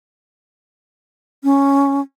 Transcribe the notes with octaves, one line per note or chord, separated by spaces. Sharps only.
C#4